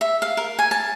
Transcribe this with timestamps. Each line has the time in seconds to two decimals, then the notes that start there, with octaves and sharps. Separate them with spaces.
0.01 E5
0.22 F5
0.37 A#4
0.59 G#5
0.71 A5